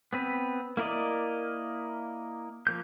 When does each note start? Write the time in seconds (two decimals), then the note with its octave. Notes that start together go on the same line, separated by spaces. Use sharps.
0.13 B3 C4 B4
0.77 A#3 E4 A#4 D5 D#5
2.67 F3 A#3 G6